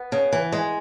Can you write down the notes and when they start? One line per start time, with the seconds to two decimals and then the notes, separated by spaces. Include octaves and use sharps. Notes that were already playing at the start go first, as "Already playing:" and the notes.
Already playing: B3
0.12 C#3
0.33 E3
0.52 G#3